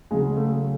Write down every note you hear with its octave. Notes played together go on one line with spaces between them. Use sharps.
C#3 F#3 G#3
A3